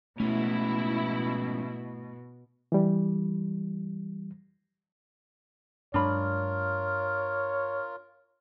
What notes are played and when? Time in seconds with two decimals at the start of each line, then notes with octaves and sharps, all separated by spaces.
0.20 B2 F3 G#3 A3 C#4 E4
2.72 E3 G3
5.94 G2 F#3 G#3 D4 F4 A#4 C#5 B5